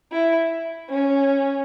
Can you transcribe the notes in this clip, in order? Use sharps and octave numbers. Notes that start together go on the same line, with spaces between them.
E4
C#4